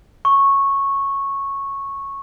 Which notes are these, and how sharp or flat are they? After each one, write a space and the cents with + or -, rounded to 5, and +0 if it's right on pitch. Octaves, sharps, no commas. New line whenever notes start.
C#6 -10